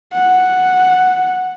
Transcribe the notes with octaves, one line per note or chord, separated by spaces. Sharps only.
F#5